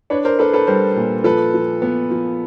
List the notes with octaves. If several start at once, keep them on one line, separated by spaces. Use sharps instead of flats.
D4 B4 C#5
A#4 C5
D4 A4 B4
A4 B4
G3 A#4 C5
A#2
F3 A4 B4
F3
B3
F3